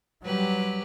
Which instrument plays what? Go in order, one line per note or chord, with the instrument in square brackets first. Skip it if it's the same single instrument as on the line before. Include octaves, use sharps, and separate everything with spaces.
[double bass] F#3 G3 [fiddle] G4 B4